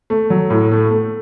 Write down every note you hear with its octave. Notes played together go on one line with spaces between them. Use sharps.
A3
F#3
A2
A3
A3